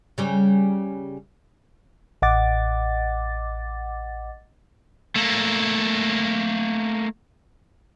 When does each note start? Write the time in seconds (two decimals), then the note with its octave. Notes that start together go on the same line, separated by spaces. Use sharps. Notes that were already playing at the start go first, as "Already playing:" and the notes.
0.18 C#3 G3 C#4
2.22 A1 D#5 F#5 D6 A6
5.16 A3 A#3